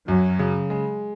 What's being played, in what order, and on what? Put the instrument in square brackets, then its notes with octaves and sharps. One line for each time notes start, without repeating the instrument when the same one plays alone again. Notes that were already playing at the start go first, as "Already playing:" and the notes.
[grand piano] F#2 [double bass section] F#3
[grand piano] C#3
G#3